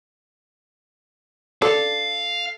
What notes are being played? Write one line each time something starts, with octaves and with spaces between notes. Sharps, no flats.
D4 A4 F5